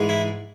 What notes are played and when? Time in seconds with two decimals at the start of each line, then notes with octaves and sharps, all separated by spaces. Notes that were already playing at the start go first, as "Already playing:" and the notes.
Already playing: G#2 E3 G#3
0.09 E4